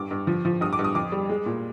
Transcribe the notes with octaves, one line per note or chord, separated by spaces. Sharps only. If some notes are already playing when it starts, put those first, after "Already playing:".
Already playing: G2 D6
G2
F3
F3
G2 D#6
D6
G2
D#6
F2 D6
G3
G#3
A#2